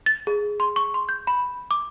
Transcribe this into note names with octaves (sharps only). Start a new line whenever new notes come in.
A6
G#4
C6
C#6
C6
G6
B5
D6